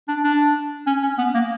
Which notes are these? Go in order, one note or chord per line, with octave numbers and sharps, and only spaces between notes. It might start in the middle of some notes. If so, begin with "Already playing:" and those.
D4
D4
C#4
C#4
B3
A#3